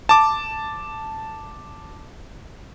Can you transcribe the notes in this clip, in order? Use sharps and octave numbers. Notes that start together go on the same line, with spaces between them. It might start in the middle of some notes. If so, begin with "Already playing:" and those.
A5 D6